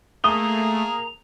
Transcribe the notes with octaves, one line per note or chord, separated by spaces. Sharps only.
A3 A#3 G#4 A#5 D#6 G7